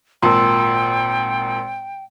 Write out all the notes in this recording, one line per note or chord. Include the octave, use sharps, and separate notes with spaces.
G#1 A#2 G5 A5 C6 E6